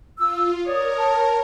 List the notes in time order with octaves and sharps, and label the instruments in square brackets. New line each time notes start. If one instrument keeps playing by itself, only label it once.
[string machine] F4 [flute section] E6
[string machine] A#4 [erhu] C#5 [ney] D5 [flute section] D#6
[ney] A5